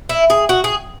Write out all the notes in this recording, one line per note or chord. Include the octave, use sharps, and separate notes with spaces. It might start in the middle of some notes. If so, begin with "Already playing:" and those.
E4
G#4
F#4
G#4